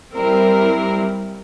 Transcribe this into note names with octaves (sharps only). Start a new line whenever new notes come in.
G3 C4 E4 A#4